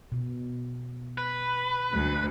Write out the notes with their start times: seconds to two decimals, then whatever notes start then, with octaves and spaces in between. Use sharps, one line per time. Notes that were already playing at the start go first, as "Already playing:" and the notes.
0.12 B2
1.18 B4
1.93 D2